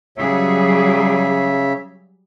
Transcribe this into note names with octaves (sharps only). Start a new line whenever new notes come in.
C#3 F#3 G3 G#4 C#5 E5